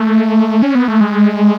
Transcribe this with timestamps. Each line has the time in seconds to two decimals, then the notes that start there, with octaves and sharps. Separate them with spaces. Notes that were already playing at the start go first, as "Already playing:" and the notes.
Already playing: A3
0.62 C#4
0.75 B3
0.88 A3
1.01 G#3